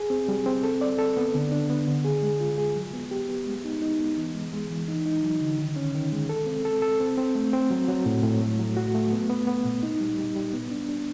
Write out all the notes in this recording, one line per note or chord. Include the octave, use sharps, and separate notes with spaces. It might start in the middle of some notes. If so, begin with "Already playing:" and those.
Already playing: G#4
C4
G3
C4
A4
D5
A4
B3
D3
D4
B3
D3
G#4
G#3
F4
G#4
F#3
B3
G4
B3
G#3
D#4
D#4
B3
E3
G#3
G#3
E3
D#4
D#4
F#3
D3
D#3
C#4
D#3
G#3
A4
C4
A4
A4
C4
C4
A3
C4
F#3
F#3
A2
A2
A3
F#3
F#4
A3
B3
B3
B3
A#2
D#4
G3
G3
G3
B3
D4
D4